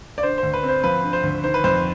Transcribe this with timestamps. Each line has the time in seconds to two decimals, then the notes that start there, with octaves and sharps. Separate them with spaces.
0.18 D5
0.23 D3 C5
0.38 D2 C5
0.53 B4
0.63 C4
0.68 C5
0.84 F3 B4
1.04 D3
1.13 C5
1.23 D2
1.44 D#3 C5
1.54 B4
1.64 F2 C5